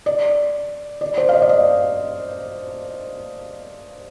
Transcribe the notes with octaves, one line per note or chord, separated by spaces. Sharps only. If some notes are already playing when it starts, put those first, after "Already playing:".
D5
D5
C5
F5
D#5
D5
D#5